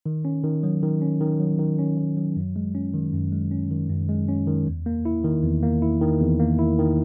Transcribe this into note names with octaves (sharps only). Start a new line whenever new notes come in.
D#3
C#4
D#3
F#3
D#3
C#4
D#3
F#3
D#3
C#4
D#3
F#3
F#2
G#3
C#4
D#3
F#2
G#3
C#4
D#3
F#2
G#3
C#4
D#3
E2
A#3
E4
D#3
E2
A#3
E4
D#3
E2
A#3
E4
D#3